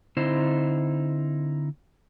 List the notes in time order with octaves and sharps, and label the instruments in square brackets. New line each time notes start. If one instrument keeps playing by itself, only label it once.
[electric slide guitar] D3 C4 D#4 E4 C5